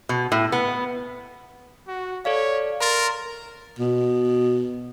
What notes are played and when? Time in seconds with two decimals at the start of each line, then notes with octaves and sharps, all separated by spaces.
0.09 B2
0.32 A2
0.52 B3
1.88 F#4
2.25 A4 C#5 D5 F5
2.80 A#4 A#5 C6 A6
3.79 B2